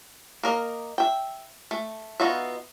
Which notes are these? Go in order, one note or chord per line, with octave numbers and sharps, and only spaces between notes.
A#3 A#4 D#5
E5 G5
A3
B3 D#4 F4 F#4 E5